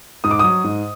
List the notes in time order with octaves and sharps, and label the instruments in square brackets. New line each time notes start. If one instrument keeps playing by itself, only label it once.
[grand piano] G#2 D#6
D6
F#3 D#6
G#2